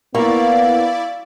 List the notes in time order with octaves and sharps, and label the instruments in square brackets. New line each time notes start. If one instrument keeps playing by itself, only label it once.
[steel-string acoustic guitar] A#3 [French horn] B3 [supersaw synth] E4 D5 [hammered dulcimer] F5 C#6